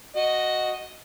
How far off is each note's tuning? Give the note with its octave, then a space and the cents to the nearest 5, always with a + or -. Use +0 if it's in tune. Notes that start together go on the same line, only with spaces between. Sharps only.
F#4 +0 D#5 +0